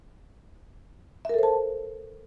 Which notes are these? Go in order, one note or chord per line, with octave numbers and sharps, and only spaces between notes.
A4 A#4 C5 E5 A5